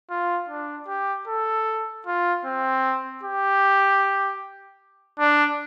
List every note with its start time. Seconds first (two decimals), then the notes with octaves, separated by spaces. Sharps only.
0.10 F4
0.49 D4
0.88 G4
1.28 A4
2.06 F4
2.45 C4
3.23 G4
5.19 D4